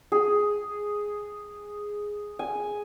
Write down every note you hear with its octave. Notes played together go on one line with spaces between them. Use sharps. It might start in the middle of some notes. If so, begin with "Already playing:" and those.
G#4
G#5